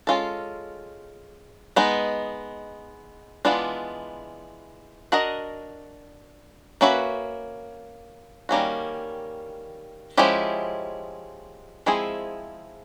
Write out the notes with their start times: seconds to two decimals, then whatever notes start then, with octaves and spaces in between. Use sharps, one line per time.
0.07 G#3 C#4 F4 A4
1.76 G#3 B3 D#4
3.45 E3 G#3 B3 D4 F4
5.12 D4 F#4 A#4 D#5
6.81 A#3 C#4 F#4 B4 E5
8.49 D#3 G3 A#3 C#4 F#4
10.17 F3 G#3 C#4 E4 G4
11.86 F3 G#3 C4 E4 G#4